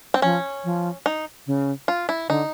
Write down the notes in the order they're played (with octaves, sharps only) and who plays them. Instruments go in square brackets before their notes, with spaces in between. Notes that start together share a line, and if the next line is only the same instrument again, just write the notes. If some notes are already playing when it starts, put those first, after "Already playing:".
[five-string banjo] C4
[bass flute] F3 [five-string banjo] C#4
[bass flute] F3
[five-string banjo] D#4
[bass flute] C#3
[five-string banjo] F4
E4
[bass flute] D3 [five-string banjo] D#4